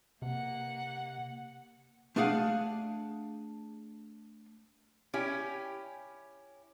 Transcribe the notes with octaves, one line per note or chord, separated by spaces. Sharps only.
C3 A#3 F#5
A3 D4 G#4 F5 F#5
C#4 E4 G4